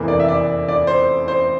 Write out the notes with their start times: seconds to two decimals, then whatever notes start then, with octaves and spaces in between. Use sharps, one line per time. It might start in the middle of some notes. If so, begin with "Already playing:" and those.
Already playing: F1 E2 E3 A#3
0.08 D5
0.20 E5
0.28 D5
0.68 D5
0.87 C5
1.28 C5